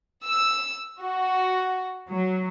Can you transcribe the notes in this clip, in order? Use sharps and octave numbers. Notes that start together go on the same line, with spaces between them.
E6
F#4
F#3